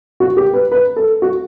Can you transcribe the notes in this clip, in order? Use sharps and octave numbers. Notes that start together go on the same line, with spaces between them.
F#4
G4
B4
B4
A4
F#4